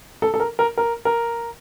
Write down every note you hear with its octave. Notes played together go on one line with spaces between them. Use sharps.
A4
A4
A#4
A#4
A#4
A#4